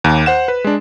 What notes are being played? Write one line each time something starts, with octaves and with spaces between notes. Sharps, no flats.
D#2
C5 F#5 E7
B4
G#3 D4